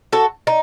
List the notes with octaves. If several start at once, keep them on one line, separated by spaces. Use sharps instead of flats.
F#4 A4
D#4